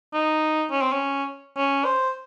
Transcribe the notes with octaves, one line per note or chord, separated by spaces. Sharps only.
D#4
C#4
C4
C#4
C#4
C5